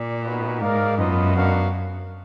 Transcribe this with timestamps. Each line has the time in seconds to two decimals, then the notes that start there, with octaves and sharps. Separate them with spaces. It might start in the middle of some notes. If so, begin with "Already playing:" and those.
Already playing: A#2 D5
0.25 B3 D#4 F#4 B4
0.61 G#2 D#4 A#4 D5 F5
0.97 F#2 B3 F4 B4 D#5
1.33 B3 D4 F#4 A#4 F5